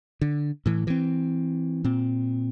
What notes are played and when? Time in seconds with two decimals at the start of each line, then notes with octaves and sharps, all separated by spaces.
0.21 D3
0.66 A2 E3
0.87 E3 C4
1.84 A#2 C4